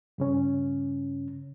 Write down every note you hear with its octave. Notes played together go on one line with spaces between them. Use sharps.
G2 C#3 C#4